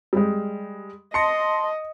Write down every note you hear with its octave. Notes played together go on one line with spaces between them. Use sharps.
G3 G#3
D#5 A5 C6 A#6 C#7